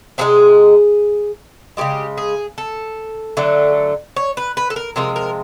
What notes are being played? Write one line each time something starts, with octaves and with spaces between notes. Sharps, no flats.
C3 E3 G#3 G#4
C#3 E3 G#3 G4
G#4
A4
D3 F#3 A3
C#5
B4
B4
A4
A#4
C3 F3 G#3 A#4
A#4